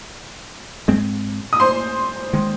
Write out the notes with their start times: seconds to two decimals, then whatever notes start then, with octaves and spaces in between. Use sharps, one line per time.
0.88 G#2 G#3 C4
1.53 D#6
1.60 C5 C6
2.33 D#3 G#3